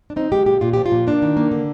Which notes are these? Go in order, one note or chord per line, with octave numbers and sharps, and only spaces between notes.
D4
C4 D#4
G#3 G4
A#2 G4
A#2 F4
F3 G4
F4
A#2
A#3 D4
D#3
A#3
D3